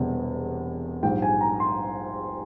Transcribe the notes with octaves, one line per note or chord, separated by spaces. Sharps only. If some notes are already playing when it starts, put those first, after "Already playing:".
Already playing: E1 E2 C3 G3
A#1 G#2 G3 G5
G#5
A#5
C6